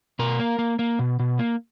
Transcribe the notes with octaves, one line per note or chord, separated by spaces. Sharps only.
B2 A#4
A#3
A#3
A#3
B2
B2
A#3